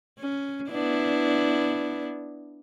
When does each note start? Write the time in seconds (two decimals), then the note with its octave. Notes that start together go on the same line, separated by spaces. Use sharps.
0.19 C#4
0.70 B3 D4 E4